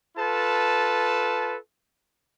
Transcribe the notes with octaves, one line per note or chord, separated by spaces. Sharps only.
F4 A4 B4 A5